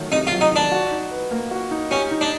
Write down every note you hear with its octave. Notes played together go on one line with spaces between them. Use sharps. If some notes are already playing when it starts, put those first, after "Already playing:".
Already playing: D#3 F#3 A3
C3 D#4
F4
F#3
D#4
D#3 D4
F#4
D#4
B4
A#3
F#4
D#4
C#4 G4
D#4
D4